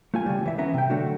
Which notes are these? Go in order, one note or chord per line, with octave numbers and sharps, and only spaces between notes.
A3 F4 G#5
C#3 G3
C#2 E3 E5
B3 C#4 E5 A#5
C3 G5
D3 F#3 A3 D4 F#4